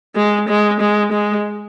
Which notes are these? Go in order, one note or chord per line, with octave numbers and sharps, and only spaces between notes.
G#3
G#3
G#3
G#3